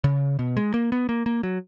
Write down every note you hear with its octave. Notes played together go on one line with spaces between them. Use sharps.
C#3
B2
G#3
A#3
B3
A#3
A#3
F#3